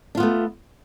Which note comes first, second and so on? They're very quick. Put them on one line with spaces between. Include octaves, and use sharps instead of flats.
D4 F4 B3 A3